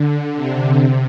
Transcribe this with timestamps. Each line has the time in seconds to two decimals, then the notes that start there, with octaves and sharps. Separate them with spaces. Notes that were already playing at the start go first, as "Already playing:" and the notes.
Already playing: D3
0.36 C3
0.78 C3